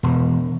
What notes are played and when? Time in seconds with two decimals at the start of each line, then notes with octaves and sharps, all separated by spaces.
0.03 E1